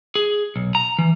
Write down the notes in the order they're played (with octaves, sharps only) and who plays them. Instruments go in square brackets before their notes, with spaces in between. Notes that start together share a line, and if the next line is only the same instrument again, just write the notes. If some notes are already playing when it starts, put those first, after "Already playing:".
[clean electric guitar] G#4
B1
A#5
E3